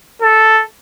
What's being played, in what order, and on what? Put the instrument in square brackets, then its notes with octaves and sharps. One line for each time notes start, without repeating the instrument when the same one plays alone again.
[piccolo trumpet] A4